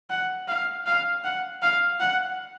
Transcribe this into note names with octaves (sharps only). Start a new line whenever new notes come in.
F#5
F5
F5
F#5
F5
F#5